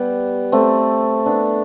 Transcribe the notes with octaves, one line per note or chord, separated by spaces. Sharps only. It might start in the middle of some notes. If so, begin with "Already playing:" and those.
Already playing: G3 B3
A3 C4
B3 D4